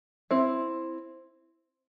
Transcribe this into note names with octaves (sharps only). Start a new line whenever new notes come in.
C4 E4